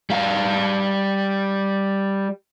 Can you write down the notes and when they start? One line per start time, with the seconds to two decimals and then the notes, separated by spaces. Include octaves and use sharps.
0.10 G3 F5